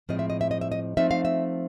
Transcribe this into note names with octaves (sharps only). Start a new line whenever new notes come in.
A2 F3 G#3 C4 D#5
E5
D#5
E5
D#5
E5
D#5
F3 A3 C4 D#4 E5
F5
E5